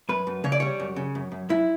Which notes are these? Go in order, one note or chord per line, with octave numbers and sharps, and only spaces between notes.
F#2 B4
F#2
C#3 C#5
D5
G3 C#5
F#2
C#3
F#2
F#2
F#2 E4